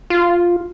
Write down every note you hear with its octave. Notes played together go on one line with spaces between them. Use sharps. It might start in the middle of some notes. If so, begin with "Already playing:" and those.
F4